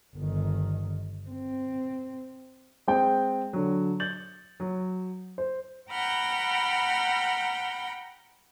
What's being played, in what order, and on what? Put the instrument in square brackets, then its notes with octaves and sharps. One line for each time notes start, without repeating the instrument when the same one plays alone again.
[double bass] G1 D#3
C4
[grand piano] G#3 C4 G5
D3 F#3
G6 A6 F#7
F#3
C5
[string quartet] F#5 G5 A#5 B5 F6 G6